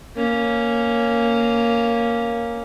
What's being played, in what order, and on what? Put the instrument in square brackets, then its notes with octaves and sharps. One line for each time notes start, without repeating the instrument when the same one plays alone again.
[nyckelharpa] A#3 C#4